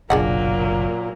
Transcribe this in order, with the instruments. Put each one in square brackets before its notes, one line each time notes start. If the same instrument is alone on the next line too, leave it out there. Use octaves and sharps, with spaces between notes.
[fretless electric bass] F#1 B1 [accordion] A#2 [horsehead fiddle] F#3 A#3 [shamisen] D4 G#4 F#5